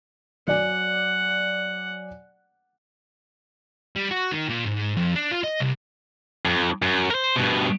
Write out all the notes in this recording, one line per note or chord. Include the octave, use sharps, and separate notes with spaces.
F#3 D5 F#5 G#5
G3
F#4
D#3
A#2
G#2
F2
D4
F4
D#5
C2
F2
F#2
A#4 C5
G2 B2